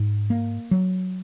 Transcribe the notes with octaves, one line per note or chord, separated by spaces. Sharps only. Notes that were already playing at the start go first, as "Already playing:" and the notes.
Already playing: G#2
A#3
F#3